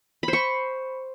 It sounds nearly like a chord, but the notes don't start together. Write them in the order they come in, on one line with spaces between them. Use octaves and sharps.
B5 C5 C#6